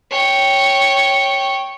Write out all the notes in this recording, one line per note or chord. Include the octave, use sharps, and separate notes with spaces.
C#5 G5